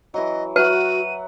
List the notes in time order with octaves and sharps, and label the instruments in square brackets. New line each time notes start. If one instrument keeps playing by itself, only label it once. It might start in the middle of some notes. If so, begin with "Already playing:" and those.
[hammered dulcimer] E3 F#3 [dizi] D#5
[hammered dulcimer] F#3 E5 F#5 [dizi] F#4 [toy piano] B4 [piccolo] D#7